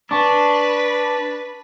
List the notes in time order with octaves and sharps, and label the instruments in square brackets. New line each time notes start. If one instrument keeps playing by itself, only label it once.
[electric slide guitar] D4 [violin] B4 [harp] A5 C#6 B6